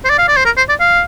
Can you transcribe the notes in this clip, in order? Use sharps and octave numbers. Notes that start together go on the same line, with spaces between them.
C5
D5
F5
D5
C5
A#4
C5
D5
F5